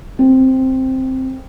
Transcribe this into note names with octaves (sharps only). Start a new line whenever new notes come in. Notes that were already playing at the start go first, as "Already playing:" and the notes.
C4